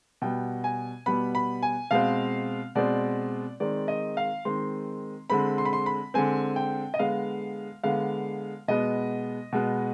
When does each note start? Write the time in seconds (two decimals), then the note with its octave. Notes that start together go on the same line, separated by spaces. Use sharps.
0.22 B2 G3 B3 G5
0.64 G#5
1.06 B2 G3 B3 B5
1.35 B5
1.63 G#5
1.91 B2 G#3 C4 F5
2.75 B2 G#3 C4 D5
3.60 D#3 G#3 C4 D5
3.88 D#5
4.17 F5
4.45 D#3 G#3 C4 C6
5.30 D3 G#3 C4 B5
5.58 C6
5.65 B5
5.73 C6
5.86 B5
6.14 D3 G#3 C4 G#5
6.56 G5
6.94 D#5
6.99 D3 G#3 B3 F5
7.83 D3 G#3 B3 F5
8.68 B2 G#3 B3 D#5
9.52 B2 G#3 B3